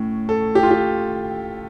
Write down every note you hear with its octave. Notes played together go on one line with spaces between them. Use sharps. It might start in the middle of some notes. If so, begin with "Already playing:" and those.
Already playing: A2 C#4
A4
G4
F4
G4